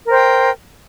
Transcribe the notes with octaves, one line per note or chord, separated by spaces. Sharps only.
A#4 C5 G5